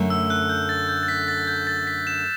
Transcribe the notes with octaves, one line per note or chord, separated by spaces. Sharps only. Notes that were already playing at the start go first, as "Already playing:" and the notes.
Already playing: F#2 D3 A3
E6
F#6
G6
A6
G6
A6
B6
A6
G6
A6
B6
E7